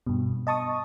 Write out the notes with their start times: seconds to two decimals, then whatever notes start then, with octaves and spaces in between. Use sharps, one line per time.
0.07 G2 B2
0.47 D#5 A5 C#6 D#6